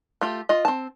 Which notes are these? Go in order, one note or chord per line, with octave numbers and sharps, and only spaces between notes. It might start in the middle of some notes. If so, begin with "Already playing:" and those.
A3 F4 G4
F4 D#5
C4 A5